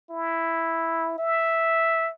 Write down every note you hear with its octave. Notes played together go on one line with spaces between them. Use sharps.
E4
E5